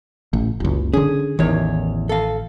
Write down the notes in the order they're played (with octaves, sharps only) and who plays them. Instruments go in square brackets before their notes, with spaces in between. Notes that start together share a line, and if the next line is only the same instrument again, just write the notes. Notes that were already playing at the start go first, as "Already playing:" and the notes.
[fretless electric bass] A1
F#1 C#2
[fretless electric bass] D3 C#4 [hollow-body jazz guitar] G#4
[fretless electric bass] A1 D#3 [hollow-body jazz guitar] E2 C#5
[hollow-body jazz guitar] A4 F5